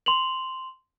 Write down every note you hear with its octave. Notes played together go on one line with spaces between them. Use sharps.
C6 F7 F#7